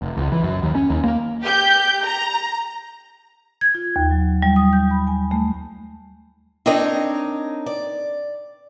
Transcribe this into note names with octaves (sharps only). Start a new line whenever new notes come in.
F1
C#2
E3
F#2
D#2
C#4
D#2
A#3
G4 G6
A#5
G#6
F4
D#2
F#3
G3
D#6
G6
B5
G#5
A3
C4 D4 D#4 A#4 C#5 D#5
D5